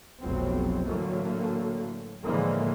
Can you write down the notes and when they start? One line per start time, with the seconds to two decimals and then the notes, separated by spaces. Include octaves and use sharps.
0.21 F1 B1 F#3 C4
0.85 A2 D3 E3 F#3 A3 A#3
2.23 A2 D3 E3 F3 G#3 A#3